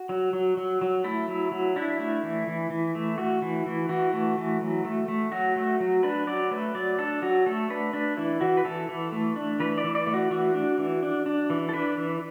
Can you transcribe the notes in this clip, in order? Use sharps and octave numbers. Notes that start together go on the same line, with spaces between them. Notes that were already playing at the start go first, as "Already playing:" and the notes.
Already playing: F#4
F#3
F#3
F#3
F#3
A3 E4
F#3
F#3
D4 E4
A3
E3
E3
E3
A3
A3 F#4
E3
E3
E3 F#4
A3
E3
F#3
A3
A3
F#3 F#4
A3
F#3
D4 B4
F#3 D5
A3 B4
F#3 D5
D4 A4
F#3 F#4
A3 A4
D4 B4
D4 B4
E3 E4
E3 F#4
B4
E3 A4
E3
A3
D4
E3 B4
D5
E3
D5
A3
F#4
E3 F#4
D4
E3
D4
D4
E3
A4
D4 B4
E3